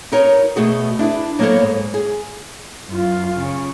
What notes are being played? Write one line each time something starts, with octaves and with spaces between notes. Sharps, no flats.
D#4 F#4 A#4 B4 C#5
B2 A3 F#4 G#4
D4 E4 G#4 B4
F#3 A#3 B3 A4 C5 C#5
G#2
G#4
F#2 F4
C#3